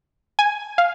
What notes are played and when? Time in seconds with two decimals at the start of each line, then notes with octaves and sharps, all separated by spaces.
0.39 G#5
0.78 F5